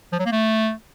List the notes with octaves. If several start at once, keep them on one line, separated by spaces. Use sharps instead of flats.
F3
F#3
A#3
A3